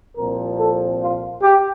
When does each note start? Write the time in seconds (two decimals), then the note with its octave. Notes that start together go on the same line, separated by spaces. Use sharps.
0.17 C2 A#2 F3 C4 A#4
0.59 A4
1.01 F4
1.42 G4